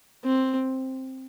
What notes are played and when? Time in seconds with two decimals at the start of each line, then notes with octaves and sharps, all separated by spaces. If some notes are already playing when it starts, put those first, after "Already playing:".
0.25 C4